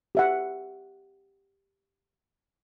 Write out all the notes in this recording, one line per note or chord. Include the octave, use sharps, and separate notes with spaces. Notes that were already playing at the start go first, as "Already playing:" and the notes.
G4 E5 F#5